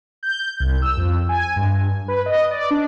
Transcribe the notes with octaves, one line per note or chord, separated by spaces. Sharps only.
G6
C2
E6
F2
G#5
G2
B4
D#5
D5
D4